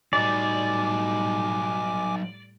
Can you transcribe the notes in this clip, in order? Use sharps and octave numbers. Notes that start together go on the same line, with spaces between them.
A2 F#3 G3 D#4 D5 G#5 D6